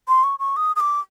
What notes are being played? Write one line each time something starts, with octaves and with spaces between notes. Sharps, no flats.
C6
C#6
C#6
D#6
D#6
D6